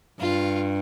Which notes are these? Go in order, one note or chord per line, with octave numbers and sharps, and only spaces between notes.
G2 F4